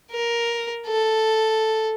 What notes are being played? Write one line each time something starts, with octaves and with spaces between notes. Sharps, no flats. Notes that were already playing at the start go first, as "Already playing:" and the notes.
A#4
A4